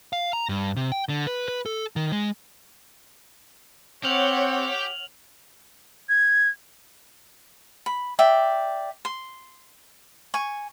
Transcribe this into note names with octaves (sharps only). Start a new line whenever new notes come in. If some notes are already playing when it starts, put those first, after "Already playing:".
F5
A#5
G2
C3
G5
D3
B4
B4
A4
D#3
G#3
C4 G4 C#5 F#5 F6 F7 F#7
G#6
B5
D5 E5 G5
C6
G#5 C#6